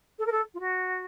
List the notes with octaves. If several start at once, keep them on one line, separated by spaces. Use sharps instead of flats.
A4
A#4
A4
F4
F#4